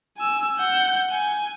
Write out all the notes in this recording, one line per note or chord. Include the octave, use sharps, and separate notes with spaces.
G#5 E6
F#5 G6
G#5